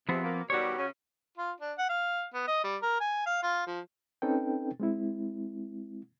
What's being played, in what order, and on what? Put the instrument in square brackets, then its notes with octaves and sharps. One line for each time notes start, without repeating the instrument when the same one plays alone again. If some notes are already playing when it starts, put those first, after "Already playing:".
[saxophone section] E2 C3 [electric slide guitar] F3 B3 C4
[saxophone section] B2 A#3
[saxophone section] B2 D#3 G3 [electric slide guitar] F#4 C#5
[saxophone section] C#3 C#4
[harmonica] F4
D4
F#5
F5
B3
D#5
G3
A#4
G#5
F5
F4
F3
[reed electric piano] C4 C#4 D#4 A4 B4 G5
G#3 C4 E4